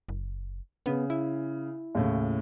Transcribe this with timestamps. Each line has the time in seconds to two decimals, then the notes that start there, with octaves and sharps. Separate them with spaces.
0.09 F#1
0.86 C#3 B3
1.10 E4
1.95 D#2 A2 C#3